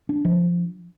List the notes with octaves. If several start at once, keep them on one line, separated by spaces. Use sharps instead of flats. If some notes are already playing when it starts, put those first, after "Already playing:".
D4
F3